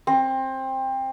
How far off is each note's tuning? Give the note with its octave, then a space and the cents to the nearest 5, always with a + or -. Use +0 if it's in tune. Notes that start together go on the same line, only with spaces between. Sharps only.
C4 +20